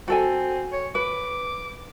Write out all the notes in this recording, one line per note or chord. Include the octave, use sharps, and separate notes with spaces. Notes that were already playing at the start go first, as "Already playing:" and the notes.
C4 F#4 A4 G#5
C#5
B4 D6